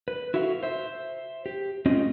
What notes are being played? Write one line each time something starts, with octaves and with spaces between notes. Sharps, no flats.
B4
E4 F#4 A4 E5 F5
C5 E5
G4
A3 C4 C#4 F4 D#5